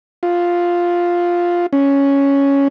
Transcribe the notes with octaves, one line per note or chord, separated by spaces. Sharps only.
F4
C#4